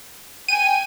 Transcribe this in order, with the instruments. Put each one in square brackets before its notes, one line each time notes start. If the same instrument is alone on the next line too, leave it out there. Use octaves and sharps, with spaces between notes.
[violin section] G5 G#5 [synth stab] D#7